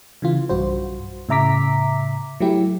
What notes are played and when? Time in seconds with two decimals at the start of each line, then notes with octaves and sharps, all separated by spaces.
0.22 C#3 E3 F4
0.49 B1 G2 F#4 C5
1.29 A2 C#3 E5 A#5 D6 B6
2.40 F#3 A3 E4 G4